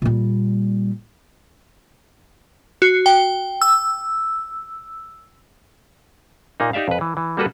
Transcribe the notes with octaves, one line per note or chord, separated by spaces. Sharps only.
A#2 G3
F#4
G5
E6
A#2 A#3 D#4
D#4 G4 D5 E5 F5
F2 B4
E3
E3
G3 A#3 F#4 A4 B4